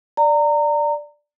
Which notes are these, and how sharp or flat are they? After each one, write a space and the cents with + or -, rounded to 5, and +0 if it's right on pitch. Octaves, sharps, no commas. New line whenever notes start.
D5 +0 A#5 -25